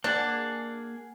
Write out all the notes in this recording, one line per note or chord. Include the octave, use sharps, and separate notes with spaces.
A#3 D4 G#4 F#5